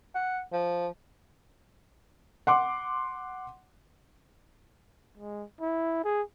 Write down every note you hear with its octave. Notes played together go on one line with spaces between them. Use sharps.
F#5
F3
F#5 C6 D6
G#3
E4
G#4